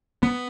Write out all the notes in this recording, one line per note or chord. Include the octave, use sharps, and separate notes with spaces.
B3